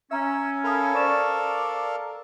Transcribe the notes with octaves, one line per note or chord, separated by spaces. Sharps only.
C#4 E5 A#5 E6
A4 A#4 F5 B5 D#6
C5 D5 C#6 E7